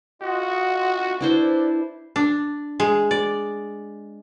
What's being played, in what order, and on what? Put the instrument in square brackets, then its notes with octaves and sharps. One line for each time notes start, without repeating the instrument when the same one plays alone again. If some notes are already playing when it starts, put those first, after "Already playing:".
[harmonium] F4 D#5 F#5 [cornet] F#4
[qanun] D4 E4 C5 [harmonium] B4 D5
[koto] D4
G#3
D5